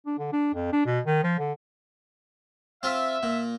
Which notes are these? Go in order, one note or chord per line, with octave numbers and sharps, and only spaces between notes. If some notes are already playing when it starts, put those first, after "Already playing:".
D4
D3
D4
F2
D4
B2
D#3
F3
D3
C4 F4 E5
A#2